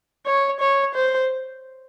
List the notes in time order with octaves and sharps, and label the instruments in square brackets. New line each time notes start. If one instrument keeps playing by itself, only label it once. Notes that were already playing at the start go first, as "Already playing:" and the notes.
[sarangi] C#5
C#5
C5